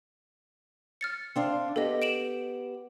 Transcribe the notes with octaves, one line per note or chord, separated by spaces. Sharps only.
F6 A6 C#7
C4 D4 F5
B3 G4 A4 D#5
D7 E7 F#7